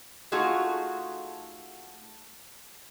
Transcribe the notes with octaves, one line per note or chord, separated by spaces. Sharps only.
A3 D#4 F4 F#4 G#4